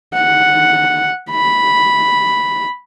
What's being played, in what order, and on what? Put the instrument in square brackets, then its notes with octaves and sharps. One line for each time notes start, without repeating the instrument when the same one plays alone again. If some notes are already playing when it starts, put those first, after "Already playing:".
[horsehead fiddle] F#5
B5